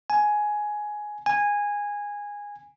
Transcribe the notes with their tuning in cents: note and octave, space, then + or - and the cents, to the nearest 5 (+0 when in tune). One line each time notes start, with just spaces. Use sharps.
G#5 +10
G#5 -15